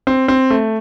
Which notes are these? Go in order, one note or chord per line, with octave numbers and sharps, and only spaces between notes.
C4
C4
A3